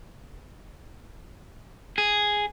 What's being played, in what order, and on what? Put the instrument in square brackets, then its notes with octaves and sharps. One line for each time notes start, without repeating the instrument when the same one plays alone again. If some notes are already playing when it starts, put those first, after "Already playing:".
[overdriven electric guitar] G#4